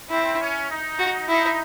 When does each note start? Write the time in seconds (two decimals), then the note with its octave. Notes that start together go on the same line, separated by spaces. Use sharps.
0.10 C4 E4
0.40 C#4
0.69 D#4
0.99 F#4
1.29 D#4 E4